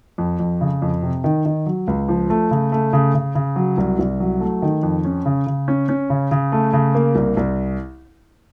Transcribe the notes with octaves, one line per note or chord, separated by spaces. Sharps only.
F2
F2
C#3
F2
C3
D#3
D#3
F#3
C#2
F3
A3
C#3
A3
C#3
C#3
C#3
F#3
C2
C2
F#3
A3
D#3
F2
C#4
C#3
C#3
C#4
C#4
C#3
C#3
A3
C#3
A#3
C2
C2